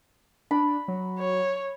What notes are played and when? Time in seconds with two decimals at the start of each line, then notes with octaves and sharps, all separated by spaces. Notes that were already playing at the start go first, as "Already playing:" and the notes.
0.51 D4 B5
0.88 F#3
1.19 C#5